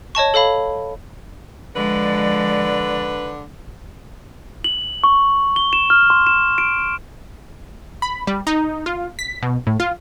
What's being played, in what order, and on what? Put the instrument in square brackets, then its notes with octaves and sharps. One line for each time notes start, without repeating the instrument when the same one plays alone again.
[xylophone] C#5 D#5 A5 C#6
A4 C#5 F5 B5
[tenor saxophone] D3 [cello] F3 G#3 [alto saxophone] B4 [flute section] D5
[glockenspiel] F#7
C#6
G7
E7
F6
C6
E7
D7
[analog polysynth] B5
G3
D#4
F4
B6
B2
A2
F4